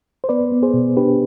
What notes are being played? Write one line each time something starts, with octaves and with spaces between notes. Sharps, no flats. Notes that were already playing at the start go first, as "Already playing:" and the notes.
C5
B3 B4 D5
B3
G#4 C5
B2
D4 G4 B4